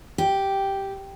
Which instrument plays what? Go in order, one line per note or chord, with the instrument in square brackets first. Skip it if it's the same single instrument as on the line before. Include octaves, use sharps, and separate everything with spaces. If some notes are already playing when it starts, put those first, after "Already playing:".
[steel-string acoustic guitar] G4